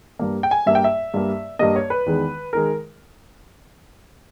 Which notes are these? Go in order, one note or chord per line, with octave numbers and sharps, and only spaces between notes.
G2 G3 A#3
G5
G#5
G2 G3 A#3 E5
G5
E5
G2 G3 A#3
G2 G3 A#3 D#5
C#5
B4
E2 D#3 G#3
D#3 G#3 A#4